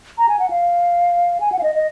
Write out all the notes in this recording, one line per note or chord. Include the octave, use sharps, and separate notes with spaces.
A#5
G#5
F#5
F5
G#5
F#5
F5
D#5
D#5